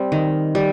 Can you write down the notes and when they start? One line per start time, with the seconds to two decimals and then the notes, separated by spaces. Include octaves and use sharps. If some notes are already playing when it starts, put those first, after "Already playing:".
Already playing: G3 C4
0.12 D#3
0.55 G3